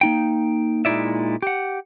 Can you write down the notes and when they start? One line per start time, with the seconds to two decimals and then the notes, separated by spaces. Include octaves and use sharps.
0.01 A#3 D#4 G5
0.85 A#2 G#3 D#4 E4 D5 E5
1.42 G4 F#5